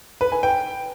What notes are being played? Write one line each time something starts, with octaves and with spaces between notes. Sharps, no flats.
B4
G#5
G5